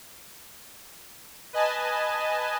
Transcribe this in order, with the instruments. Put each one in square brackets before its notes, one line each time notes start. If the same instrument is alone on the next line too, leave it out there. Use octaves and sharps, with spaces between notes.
[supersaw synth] B4 D#5 G#5 A5